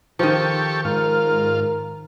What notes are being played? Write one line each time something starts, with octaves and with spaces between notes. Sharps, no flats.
D#3 F3 G4 A4 C#6
G#2 F4 A#4